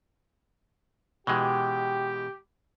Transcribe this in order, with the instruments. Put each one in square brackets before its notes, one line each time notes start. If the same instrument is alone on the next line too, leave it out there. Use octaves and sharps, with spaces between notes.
[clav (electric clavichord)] B2 E3 G#3 [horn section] G4